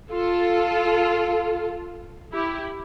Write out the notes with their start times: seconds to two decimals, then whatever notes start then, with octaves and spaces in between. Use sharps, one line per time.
0.11 F4 A4
2.32 E4 G4